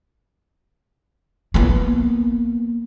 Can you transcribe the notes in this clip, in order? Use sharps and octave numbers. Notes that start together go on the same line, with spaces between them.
A#3 B3